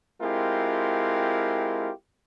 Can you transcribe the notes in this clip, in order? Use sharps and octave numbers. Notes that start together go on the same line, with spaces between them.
G#3 C4 E4 F4 G4 A#4